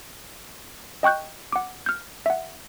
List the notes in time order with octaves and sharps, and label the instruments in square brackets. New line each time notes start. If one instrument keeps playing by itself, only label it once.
[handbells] D#5 G5 C#6 F#6 G6
F#5 D6
F6 G6
E5 F#5